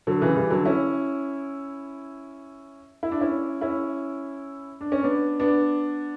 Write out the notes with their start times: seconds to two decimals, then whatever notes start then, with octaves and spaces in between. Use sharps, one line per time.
0.07 D3 F#3
0.21 C#3 E3
0.36 E3 G3
0.50 D3 F#3
0.66 C#4 E4
3.03 E4
3.11 D4
3.21 C#4 E4
3.61 C#4 E4
4.81 D4
4.92 C#4
5.04 B3 D4
5.40 B3 D4